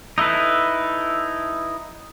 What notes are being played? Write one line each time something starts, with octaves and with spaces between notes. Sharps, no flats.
D#4 E4 A4 B4